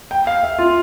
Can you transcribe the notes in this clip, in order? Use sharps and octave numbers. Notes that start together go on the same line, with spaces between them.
G5
F5
E5
F4